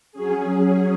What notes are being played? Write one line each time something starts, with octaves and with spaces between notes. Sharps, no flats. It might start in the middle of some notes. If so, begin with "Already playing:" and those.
F#3 C#4 G#4